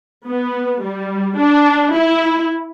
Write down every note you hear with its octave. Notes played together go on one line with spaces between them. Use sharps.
B3
G3
D4
E4